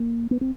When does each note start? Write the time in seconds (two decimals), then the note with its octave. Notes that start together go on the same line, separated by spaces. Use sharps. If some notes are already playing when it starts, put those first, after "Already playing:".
Already playing: A#3
0.31 B3
0.41 C4